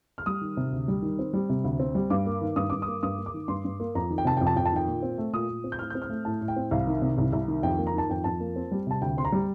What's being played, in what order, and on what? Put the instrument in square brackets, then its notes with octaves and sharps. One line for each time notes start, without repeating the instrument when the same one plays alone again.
[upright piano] F6
G3 D#6
D#3
C3
D2
G3
D#3
C4
G3
C3
D2
C4
G3
G2 D6
A#3
D#3
G2 D#6
G2 D6
D#6
A#3
G2 D#6
A#3
D6
D#3
G2 C6
G2
A#3
F2 A#5
D#3
G5
C3 A5
F2 G5
A5
F2 G5
A5
D#3 G5
A#2
C4
A3
A#2 D#6
A#2
C4
G6
A2 F6
G6
C4
F6
A3
A2 A5
A2
G5
C4
C2 F5
D#3
C3
C2
C2
D#3
F2 G5
A#3
A#5
D#3 A5
F2 G5
F2 A5
A#3
C4
G3
C3 A5
D2 G5
C4 C6
A#5
G3